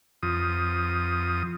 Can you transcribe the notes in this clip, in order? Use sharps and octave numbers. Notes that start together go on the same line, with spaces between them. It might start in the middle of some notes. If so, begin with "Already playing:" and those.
F2 D#6